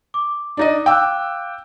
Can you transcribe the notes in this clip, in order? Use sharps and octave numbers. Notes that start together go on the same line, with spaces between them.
D6
D4 D#4 D#5
F5 G5 D6 E6 F#6